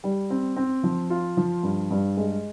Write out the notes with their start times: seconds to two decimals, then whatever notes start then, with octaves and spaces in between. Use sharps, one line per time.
0.04 G3
0.30 C4
0.56 C4
0.83 F3
1.10 F4
1.37 F3
1.63 G2
1.91 G2
2.17 G#3